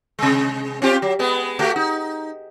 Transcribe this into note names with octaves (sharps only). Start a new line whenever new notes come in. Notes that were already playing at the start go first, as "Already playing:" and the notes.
C3 G#3
C4 F4 G4
F#3
G#3 B3
A3 F#4 G4
D#4